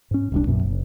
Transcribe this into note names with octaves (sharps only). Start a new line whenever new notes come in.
G#2 C#4
D1 C2 D4
A#1 F#2 B2
F#1